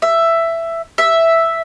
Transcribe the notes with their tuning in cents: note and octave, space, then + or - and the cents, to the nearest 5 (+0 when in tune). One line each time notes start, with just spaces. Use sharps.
E5 +10
E5 +0